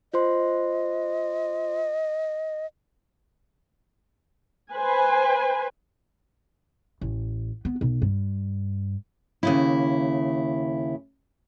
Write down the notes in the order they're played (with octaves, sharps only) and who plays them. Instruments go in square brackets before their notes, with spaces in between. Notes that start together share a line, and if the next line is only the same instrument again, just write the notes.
[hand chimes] F4 C5 C6 [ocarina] D#5
[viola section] B4 C5 G#5
[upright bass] A1
B3
B1
G2
[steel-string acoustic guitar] D#2 C#3 E4